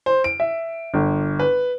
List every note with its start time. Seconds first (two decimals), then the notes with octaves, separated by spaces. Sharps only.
0.06 C5
0.24 D7
0.40 E5
0.94 G1
1.40 B4